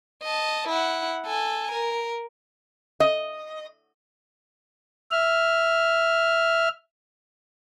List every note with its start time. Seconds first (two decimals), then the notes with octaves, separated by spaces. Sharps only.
0.22 D#5 A5
0.68 E4 F#5
1.26 A4 G#5
1.71 A#4
3.00 D#5
5.12 E5 F6